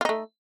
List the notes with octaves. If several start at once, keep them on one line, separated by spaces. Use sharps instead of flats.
A3 D#4 F4